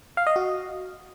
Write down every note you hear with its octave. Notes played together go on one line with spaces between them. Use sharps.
F5
D#5
F#4